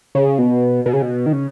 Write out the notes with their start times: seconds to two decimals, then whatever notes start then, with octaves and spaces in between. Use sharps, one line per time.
0.15 C#3
0.38 B2
0.86 B2
0.93 C#3
1.02 B2
1.26 D#3
1.33 C#3